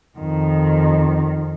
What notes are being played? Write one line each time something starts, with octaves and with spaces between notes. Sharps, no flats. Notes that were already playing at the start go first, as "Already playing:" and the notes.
F2 D#3